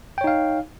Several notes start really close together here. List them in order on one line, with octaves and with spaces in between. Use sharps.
G5 C#5 D#4 F5